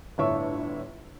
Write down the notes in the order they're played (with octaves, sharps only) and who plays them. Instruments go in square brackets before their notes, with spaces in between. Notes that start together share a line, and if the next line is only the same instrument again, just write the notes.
[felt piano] G1 A2 D4 C#5 E5 C#6